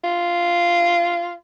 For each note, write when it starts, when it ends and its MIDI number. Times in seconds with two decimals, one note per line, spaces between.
0.04 1.33 65